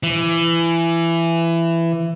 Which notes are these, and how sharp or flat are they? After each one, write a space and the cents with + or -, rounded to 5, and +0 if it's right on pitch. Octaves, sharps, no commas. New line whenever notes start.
E3 +20